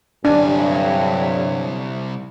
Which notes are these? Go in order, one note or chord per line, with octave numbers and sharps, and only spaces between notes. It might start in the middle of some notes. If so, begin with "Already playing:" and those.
C2 G2 D3 F#3 D4 G#5